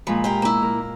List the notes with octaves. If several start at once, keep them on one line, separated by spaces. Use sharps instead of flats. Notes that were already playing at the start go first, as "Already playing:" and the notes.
A#2 F3 G#3 B5
F4 G4 A#4
A#3 E4
A#4